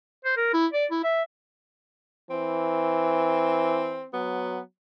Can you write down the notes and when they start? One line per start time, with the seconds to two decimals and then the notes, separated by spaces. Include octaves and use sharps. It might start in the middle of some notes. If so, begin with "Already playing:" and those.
0.25 C5
0.37 A#4
0.54 E4
0.73 D5
0.91 E4
1.04 E5
2.30 E3 C4
4.13 F#3 B3